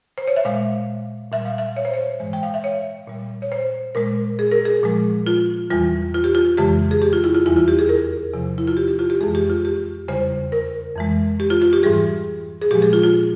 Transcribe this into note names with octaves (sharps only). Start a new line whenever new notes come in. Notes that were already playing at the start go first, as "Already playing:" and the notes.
C5
C#5
E5
A#2 G#3 F5
A#2 G3 E5
F5
E5
C#5
C5
C#5
G#2 E3 G#3
G5
F5
E5
C#5
A#2 G3
C#5
C5
A#2 G#3 A#4
G#4
A#4
G#4
A#2 F3 G#3
F4
E2 E3 G3 F4
F4
G4
F4
F2 C#3 E3 G#3 G4
G#4
G4
F4
E4
F4
E2 E3 G3 E4
F4
G4
G#4
A#4
E2 C3 F3
E4
F4
G4
G4
F4
G4
F2 E3 G#3 G#4
G4
F4
G4
E2 C#3 G3 C5
A#4
F2 E3 G#3
G4
F4
F4
G4
G#2 E3 G3 G#4
G#4
A#2 F3 G#3 G4
G#4
F4
F4